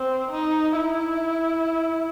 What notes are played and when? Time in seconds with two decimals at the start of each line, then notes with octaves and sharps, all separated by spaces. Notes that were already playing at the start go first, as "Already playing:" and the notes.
Already playing: C4
0.31 D#4
0.77 E4